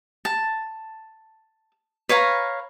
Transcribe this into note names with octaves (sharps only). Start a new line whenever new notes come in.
A5
B4 C#5 F5 A#5